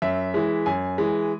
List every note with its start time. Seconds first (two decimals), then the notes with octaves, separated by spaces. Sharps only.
0.02 F#2 E5
0.34 E3 G#3
0.66 F#2 G#5
0.98 E3 G#3